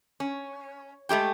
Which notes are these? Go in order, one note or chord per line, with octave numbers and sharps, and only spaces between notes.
C#4
G#3 A3 G4 G5